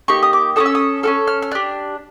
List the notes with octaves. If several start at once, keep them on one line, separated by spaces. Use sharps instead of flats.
A#3 D#4 G4 C#6
D#6
D6
C#4 F#4 A4 D#6
E6
D#6
C#4 F#4 A4 F6
F6
F6
D4 G4 F#6